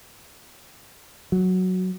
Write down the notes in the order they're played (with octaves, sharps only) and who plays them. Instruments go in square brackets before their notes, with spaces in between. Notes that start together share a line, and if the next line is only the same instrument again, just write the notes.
[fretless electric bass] F#3